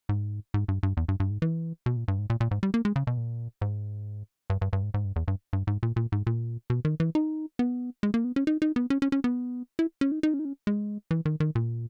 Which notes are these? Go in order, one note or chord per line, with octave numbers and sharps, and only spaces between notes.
G#2
G#2
G2
G2
E2
G2
G2
G#2
E3
B2
A#2
G2
G#2
A#2
A#2
G#2
G3
A#3
G#3
C#3
B2
A#2
G#2
G2
G2
G2
G#2
G#2
G2
E2
G2
G2
G#2
A#2
A#2
G#2
A#2
B2
D#3
E3
D#4
B3
G#3
A#3
B3
C#4
D#4
D#4
B3
C#4
C#4
C#4
B3
E4
C#4
D#4
D#4
C#4
D#4
C#4
G#3
E3
D#3
D#3
A#2